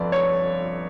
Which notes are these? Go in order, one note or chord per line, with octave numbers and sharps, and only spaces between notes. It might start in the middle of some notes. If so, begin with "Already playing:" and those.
Already playing: G1 F2 D5
C#5